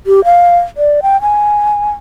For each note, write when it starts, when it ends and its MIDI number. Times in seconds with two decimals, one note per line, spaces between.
0.07 0.24 67
0.24 0.57 77
0.77 1.00 74
1.03 1.20 79
1.22 1.91 80